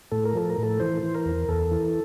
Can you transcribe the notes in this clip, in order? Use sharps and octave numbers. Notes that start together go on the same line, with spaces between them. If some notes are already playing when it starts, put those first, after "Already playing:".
A2 A4
A#4
F3 A4
A#4
A2
A4
E3 C5
E3
A#4
E2
E2 A4
E3